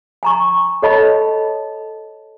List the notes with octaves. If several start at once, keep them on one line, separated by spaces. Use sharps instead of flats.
G#5 A#5 C#6
A4 C#5 D#5 A5 B5